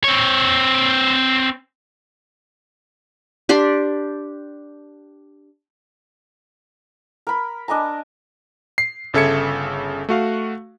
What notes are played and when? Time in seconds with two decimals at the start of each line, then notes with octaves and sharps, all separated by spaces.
0.04 C4 C#5
3.49 D4 G4 D5 C6
7.27 A#4 B5
7.68 D4 D#5 G#5 A#5
8.78 C7
9.13 G1 C#3 A4 E5 G#6 C#7
10.09 A3 F#4 F5